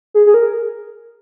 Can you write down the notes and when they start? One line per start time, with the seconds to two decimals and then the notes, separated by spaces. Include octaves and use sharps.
0.14 G#4
0.26 G#4
0.34 A#4